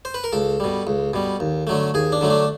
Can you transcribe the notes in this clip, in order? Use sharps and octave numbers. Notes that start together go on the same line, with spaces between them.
C5
B4
A#4
C#2 A4
B2 G3
C#2
B2 G3
D#2
D3 F#3 A3
D#2 G#4
D4
D3 F#3 A3
D4